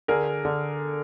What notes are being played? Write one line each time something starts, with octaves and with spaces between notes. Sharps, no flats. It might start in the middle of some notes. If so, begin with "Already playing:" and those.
D3 G#4 A#4
D3